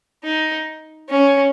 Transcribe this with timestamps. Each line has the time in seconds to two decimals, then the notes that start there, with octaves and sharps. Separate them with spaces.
0.24 D#4
1.09 C#4